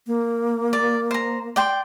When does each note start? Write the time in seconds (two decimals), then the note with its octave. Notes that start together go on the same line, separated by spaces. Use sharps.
0.07 A#3
0.73 D5
1.11 C5 A#5
1.56 D5 G5 C6